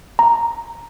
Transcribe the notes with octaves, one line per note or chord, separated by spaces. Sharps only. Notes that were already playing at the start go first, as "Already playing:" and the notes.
A#5